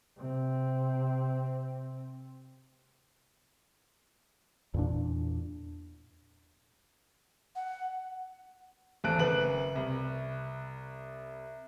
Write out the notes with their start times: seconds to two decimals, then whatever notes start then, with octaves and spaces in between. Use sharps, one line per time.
0.17 C3 C4
4.74 E2 A#2 D4
7.56 F#5
9.04 G#1 E2 A4 F#6 D7
9.19 F#1 B4 F#7
9.75 C2